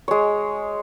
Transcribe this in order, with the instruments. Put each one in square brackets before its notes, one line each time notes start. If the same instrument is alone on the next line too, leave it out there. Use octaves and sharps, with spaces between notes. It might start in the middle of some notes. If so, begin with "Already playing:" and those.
[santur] G#3 C#5